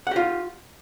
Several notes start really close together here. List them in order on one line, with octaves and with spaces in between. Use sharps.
F#5 G4 F4